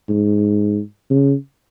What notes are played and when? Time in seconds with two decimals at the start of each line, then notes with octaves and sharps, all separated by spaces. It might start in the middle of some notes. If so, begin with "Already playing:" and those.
0.09 G#2
1.10 C#3